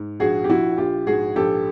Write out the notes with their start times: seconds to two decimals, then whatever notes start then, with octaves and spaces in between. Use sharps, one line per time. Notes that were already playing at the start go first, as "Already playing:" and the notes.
Already playing: G#2
0.20 A#1 F#4 G#4
0.44 G4
0.49 F3 E4 F#4
0.78 A#1 F4 G4
1.07 G#2 F#4 G#4
1.36 A#1 G4 A4